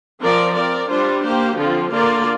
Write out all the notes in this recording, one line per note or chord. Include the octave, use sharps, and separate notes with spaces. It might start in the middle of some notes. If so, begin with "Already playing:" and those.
F3 C4 A#4 D5
C4 A#4 D5
G3 D4 F4 C5
A#3 G4 C5
D3 F3 C4 F4
D3 A#3 F4 A#4 D5